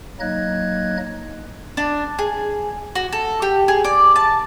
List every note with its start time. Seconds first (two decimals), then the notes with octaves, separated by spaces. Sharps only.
0.20 F#3 A#3 D#4 D#5 F#6 G#6
1.77 D4
2.19 G#4
2.95 F#4
3.12 A4
3.42 G4
3.68 G#4
3.84 D5
4.16 A5